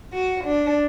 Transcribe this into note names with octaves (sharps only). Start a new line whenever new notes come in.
F#4
D4